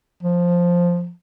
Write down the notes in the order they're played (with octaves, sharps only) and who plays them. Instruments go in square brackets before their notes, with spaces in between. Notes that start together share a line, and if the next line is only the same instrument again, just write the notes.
[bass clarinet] F3